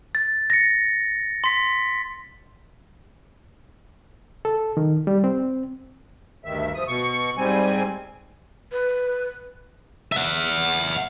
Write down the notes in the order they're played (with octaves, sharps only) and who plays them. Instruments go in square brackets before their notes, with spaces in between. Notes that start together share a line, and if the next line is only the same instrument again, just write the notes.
[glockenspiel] A6
A#6 C#7
C6 B6
[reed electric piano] A4
D#3
G3
C4
[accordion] D2 G2 D#3 E5
F3 D#6
B2 C#6
G#2 G3 C4 G#5
[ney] B4
[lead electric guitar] E5 F#5